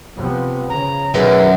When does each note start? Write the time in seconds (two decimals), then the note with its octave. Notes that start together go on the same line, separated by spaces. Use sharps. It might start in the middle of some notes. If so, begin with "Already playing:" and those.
0.16 C3 F3 B3
0.69 C#3 A#5
1.14 F#2 B2 D#3 G#4 B4